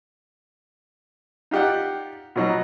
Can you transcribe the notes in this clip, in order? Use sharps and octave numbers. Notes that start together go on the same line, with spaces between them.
D#4 F4 G4 D5 F#5
B2 F3 F#3 D#4